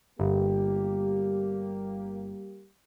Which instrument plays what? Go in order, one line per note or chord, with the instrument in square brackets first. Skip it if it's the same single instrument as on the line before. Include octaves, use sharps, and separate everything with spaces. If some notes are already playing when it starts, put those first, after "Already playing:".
[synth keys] G1 [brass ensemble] G3 A#3 G4